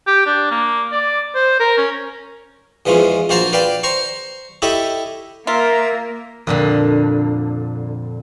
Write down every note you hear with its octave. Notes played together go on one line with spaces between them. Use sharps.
G4
D4
A#3
D5
C5
A#4
C#4
E2 E3 F3 G#3 C#4
A#1 A#3 F#4 C5 A5 A#5
B4 D5 F5 G5 A5
C5 A#5 C#6
E4 G4 A4 C#5 D#5 E5
A#3 F4 A#4 E5
F2 A#2 D3